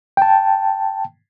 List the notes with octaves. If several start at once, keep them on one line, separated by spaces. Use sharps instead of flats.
G5 A5